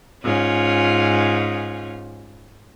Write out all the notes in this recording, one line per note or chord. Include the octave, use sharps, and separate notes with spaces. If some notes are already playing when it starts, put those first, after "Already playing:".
G#2 C#4 F4